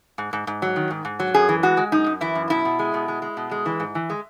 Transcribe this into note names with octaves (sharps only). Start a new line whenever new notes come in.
G#2
G#2
G#2
F#3
D#3
G#2
G#2
F#3
F#2 G#4
E3
G#3 F#4
G#3
F#2 D#4
F#2
E3 E4
F#2
B2 E4
B2
G#3
B2
G#3
G#3
B2
G#3
E3
G#2
E3
G#3